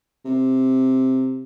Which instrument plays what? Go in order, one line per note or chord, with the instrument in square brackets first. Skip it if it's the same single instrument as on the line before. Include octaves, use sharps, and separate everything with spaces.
[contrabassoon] C3